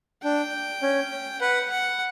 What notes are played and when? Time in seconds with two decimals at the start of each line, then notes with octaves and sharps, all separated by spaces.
0.23 D4 G5
0.82 C#4
1.41 B4 F#5
1.70 F#5